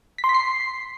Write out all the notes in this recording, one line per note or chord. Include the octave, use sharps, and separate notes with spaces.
B6
C6
B6
C7